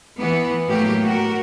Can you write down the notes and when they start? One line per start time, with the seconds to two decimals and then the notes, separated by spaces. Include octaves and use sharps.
0.19 E3 B3
0.69 A2 F#3 A3 A#3 G4
1.04 F#4 A#4